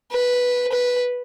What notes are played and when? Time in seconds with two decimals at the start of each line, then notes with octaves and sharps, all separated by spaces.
0.12 B4
0.72 B4